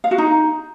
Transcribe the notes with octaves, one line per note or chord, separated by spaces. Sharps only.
F5
F#4
D#4